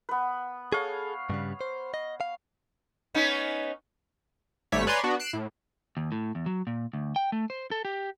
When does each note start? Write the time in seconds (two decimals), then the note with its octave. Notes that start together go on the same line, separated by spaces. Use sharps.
0.09 B3 B4
0.72 G#4 A4 C#5 F5
1.30 G2 C#3 G3
1.61 C5
1.94 D#5
2.21 F5
3.14 B3 C#4 D#4
4.72 G#1 G#2 G3 A3 C#5 B6
4.87 B4 C#5 D5 G#5 A#5 C6
5.04 B3 D4 F#4
5.20 F#6 C7 D7 E7
5.33 A2
5.97 D#2
6.12 A2
6.35 E2
6.46 F#3
6.67 A#2
6.93 D2
7.16 G5
7.32 A3
7.50 C5
7.71 A4
7.85 G4